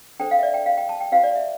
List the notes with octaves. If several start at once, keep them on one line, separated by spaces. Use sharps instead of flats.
D4 A4 C5 G5
F5
E5
D5
G5
F5
G5
A5
G5
E4 G4 C5 F5
D5
E5